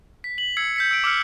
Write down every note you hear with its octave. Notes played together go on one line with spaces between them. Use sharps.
B6
F#7
E6 G#6 C7 C#7
G6 B6 C#7
E6 D7
D6 E6 F6 C#7